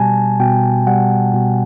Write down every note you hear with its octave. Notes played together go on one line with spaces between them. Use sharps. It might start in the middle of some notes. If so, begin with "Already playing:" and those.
Already playing: B2 G3 G#5 A5
B2 G5
G3 F#5
B2